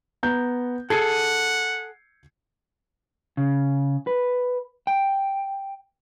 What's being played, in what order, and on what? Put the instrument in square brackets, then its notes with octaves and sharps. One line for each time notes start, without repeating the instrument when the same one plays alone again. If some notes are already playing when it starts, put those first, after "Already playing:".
[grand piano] B3 A#5 G6
[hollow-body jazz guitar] G#4 A4 [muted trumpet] F#5 [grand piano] G#6 C7 C#7
[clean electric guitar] C#3
B4
G5